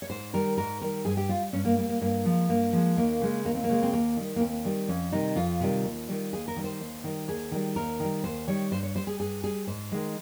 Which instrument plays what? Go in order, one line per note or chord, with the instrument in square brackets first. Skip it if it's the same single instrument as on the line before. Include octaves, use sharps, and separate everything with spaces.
[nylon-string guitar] C#5
G#2 C5
D#3 G3 A#4
G#2 A#4
D#3 G3 A#4
G2 G#4
G4
G3 F4
G2 C#4
A#3
G3 A#3
A#3
G2 A#3
F3 G#3
G2 A#3
F3 G#3
D#2 A#3
C#3 G#3
D#2 A#3
C4
A#3
C#3 G#3
C4
D#2 A#3
D#3 G3
A#3
D#2 C4
D#3 G3
F2 C#4
C3 D#3 G3 D#4
F2 F4
C3 D#3 G3
D#2
D#3 G3
D#2 G#4
A#4
D#3 G3
C5
D#2
D#3 G3
D#2 G#4
D#3 G3
D#2 A#4
D#3 G3
D#2 C5
D#3 G3 C#5
G2 C5
C#5
G3 C5
G#4
G2 G#4
G3 G#4
G#2 C5
D#3 G#3